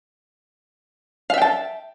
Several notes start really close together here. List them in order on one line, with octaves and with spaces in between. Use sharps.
F5 E5 G5 A5